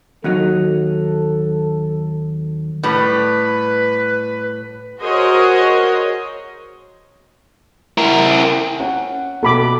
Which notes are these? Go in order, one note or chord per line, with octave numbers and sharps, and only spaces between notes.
D#2 F#3 D#4 A4
A2 G3 B4
F#4 G#4 A#4 C5 C#5 D#5
E4 A#4
C#4 F#5
B2 A4 B5 D6